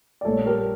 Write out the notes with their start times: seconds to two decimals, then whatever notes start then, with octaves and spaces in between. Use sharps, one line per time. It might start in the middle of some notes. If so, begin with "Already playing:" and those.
0.21 D5
0.25 A#1 A#2 G3 A4 C#5
0.46 G4 A#4